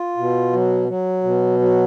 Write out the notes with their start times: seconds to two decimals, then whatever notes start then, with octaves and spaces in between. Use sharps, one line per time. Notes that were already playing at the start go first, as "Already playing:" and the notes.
Already playing: F4
0.17 B2
0.53 F#3
0.88 F#3
1.23 B2
1.59 F#3